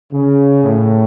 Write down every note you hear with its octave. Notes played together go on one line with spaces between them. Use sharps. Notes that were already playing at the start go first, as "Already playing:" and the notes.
C#3
A2